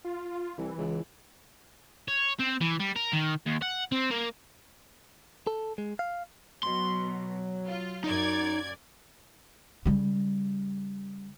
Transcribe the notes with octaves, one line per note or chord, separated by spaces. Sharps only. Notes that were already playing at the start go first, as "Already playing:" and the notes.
F4
C2 E3
C#2
C#5
C4
E3
G3
A#4
D#3
D#2
F#5
C4
A#3
A4
G#3
F5
B2 F#3 C6
F4
F#2 D#4 D5 G#6
C#3 G3